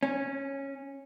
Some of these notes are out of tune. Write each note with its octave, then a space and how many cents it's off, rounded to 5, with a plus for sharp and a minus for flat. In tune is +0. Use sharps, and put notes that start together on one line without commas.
C#4 -10